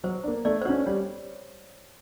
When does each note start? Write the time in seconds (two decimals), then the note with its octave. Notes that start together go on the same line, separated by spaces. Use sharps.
0.04 F#3 C5
0.24 A#3 D4
0.45 A3 D5
0.62 C5
0.65 C#4 F#4 C#5
0.86 G3 C#5